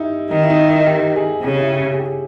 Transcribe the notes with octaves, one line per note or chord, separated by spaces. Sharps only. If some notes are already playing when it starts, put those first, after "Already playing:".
Already playing: D#4 E4 G4
D#3 D#4
E4
D#4
E4
G4
G#4
C#3 G4
E4
G4
G#4
G4